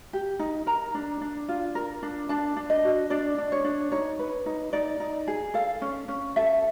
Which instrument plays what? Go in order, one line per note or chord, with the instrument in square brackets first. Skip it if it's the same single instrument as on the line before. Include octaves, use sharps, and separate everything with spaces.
[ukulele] G4
D#4
A#4 A#5
D4
D4
F4
A#4
D4
D4 A5
D4
D#5
F#4
D4 D5
D4
C#5
D4
D#4 C#5
B4
D#4
D#4 D5
D#4
G#4
A4 F5
C#4
C#4
A4 E5